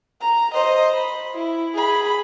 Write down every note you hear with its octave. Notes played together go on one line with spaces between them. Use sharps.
A#5
C5 D#5
B5
E4
G#4 B5